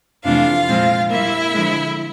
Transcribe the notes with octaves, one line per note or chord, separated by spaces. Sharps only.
F2 C3 E3 A3 D4 F4 F5
A#2 F3 G#3 C4
A#2 G3 A#3 E4 E5
D3 F3 G#3